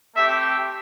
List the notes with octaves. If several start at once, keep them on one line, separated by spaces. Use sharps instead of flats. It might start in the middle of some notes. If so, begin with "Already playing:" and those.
A3 C4 G4 E5